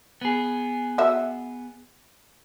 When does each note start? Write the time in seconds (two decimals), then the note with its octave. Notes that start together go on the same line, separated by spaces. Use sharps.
0.21 B3 G#4
0.98 F#4 E5